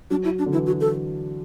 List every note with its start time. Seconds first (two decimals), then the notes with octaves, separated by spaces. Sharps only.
0.10 F#3 D4
0.25 E4
0.39 D4
0.46 D3
0.53 E3 E4
0.67 F#4
0.81 A4